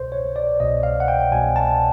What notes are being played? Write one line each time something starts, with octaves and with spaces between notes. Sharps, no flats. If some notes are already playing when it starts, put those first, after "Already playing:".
Already playing: C2 B2 C5
C#5
D5
C2 B2 D#5
F5
F#5
G5
C2 B2 G#5
A5